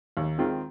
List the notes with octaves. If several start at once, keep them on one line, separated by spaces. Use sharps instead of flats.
D#2
D#3 G#3 C4 F4